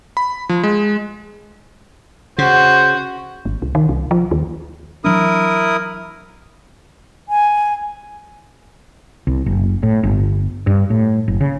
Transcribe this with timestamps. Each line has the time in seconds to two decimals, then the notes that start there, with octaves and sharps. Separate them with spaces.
0.17 B5
0.49 F3
0.63 G#3
2.38 C#3 F#4 C5
3.46 G#1
3.62 C2
3.75 D#3
3.89 C2
4.11 F3
4.31 D#2
5.04 E3 F#3 D4 E4 A#4 D#6
7.29 G#5
9.27 C2
9.46 F#1
9.83 A2
10.03 G1
10.67 G2
10.90 A2
11.28 F#1
11.41 C#3